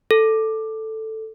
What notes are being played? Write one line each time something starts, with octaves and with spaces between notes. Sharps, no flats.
A4